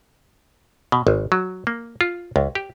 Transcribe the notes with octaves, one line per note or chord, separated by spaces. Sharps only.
B2
G#1
F#3
A#3
F4
C#2
G4